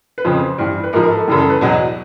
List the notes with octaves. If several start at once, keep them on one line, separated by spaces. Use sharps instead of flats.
B4
F2 C#3 F3 C5
G2 E3 G3
B4
G#2 F3 A#4
A#4
A4
F#2 C#3 E3 G3
A4
B4
E2 B2 F#3